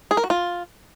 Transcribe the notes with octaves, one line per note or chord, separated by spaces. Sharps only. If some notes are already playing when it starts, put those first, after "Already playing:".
G#4
A#4
F#4
F4